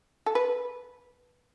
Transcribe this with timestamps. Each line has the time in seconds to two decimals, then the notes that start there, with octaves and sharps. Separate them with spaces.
0.26 A4
0.35 B4